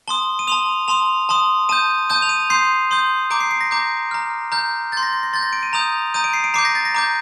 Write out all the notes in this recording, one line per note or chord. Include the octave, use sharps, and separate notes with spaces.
A5 C6 D#6 G7
D#7
A5 C6 D#6 F7
A5 C6 D#6 F7
A5 C6 D#6
A5 D#6 G6 D#7
A5 D#6 G6 D#7
F7
D#7
C6 D#6 G6 C7
C6 D#6 G6
A#5 D6 G6 D7
C7
C7
A#6
A#5 D6 G6
A#5 F6
A#5 F6 G6
C6 G6 A6
A#6
A#6
A#6
C6 G6 A6
A#6
D7
D#7
A#5 D#6 G6 F7
A#5 D#6 G6 D#7
D7
C7
D7
A#5 D6 G6 C7
A#6
A6
A#6
A#5 D6 G6